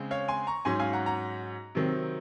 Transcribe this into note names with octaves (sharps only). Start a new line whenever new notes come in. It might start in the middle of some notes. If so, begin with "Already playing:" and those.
Already playing: C#3 G#3 C4
C#5 F5
G#5 C6
A#5 C#6
G#2 F#3 C#4 G#5 C6
F5 G#5
F#5 A#5
F#5 A#5
C3 D#3 F#3 C4